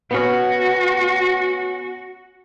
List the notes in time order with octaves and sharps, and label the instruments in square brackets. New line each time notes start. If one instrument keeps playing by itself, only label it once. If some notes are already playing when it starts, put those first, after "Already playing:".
[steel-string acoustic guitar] B3 C#4 [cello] F#4